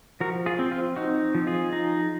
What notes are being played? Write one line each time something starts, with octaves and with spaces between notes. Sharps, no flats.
F3 F#4 A#4
F4 G#4
C4
F4
D#4 F#4
F3
F4 G#4
D#4